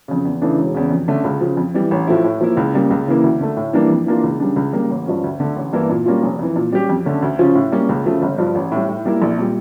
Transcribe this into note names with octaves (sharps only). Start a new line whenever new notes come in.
F2 C#3
E2
C#3 E3 A3 D4
E1
E2 C#3
F2
D3 A3 C#4
C#2
C#3 F3
F2
E3 G3
A1
A2 F3 A3 E4
A2
F3 A#3 E4
C#2
C#3 G3 A#3
C#2
C#3 E3 A#3 E4
D2
D3 A3
A2
E3 G3 A#3 D4
F2
E3 A#3 D4 F4
C#2
C#3 G3 D4
C#2
C#3 G3 A#3
A1
G2 F3 C#4
D2
D3 A3
A1
G2 E3 A#3 E4
A#2
G3 A#3 C#4 F4
F1
F2 E3
A#2
G3 C#4 G4
F2
D3 A3 C#4
D2
C#3 F3 C#4 F4
A2
G3 A#3 C#4
C#2
C#3 F3 A3
G1
G2 F3
A1
A2 G3
A2
G3 A#3 E4
A#1
A#2 G3